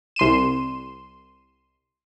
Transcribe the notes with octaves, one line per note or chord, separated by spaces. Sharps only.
C2 C6 D#7 E7